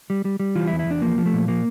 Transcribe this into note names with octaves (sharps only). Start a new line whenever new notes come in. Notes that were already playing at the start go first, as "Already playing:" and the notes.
G3
G3
G3
E3 F4
E4
E2
E4
E2 D4
F3 A#3
F3
A3
A#2
F3 A#3